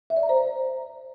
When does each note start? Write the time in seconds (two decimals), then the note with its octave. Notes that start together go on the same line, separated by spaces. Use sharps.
0.10 E5
0.17 D5
0.23 A#5
0.29 C5